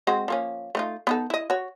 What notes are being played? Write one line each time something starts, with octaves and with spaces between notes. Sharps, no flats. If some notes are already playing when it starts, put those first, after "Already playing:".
G#3 C4 F#4
F3 A#3 C#4
A3 D#4 F4
B3 D#4 A4
E4 D#5
F#4 C#5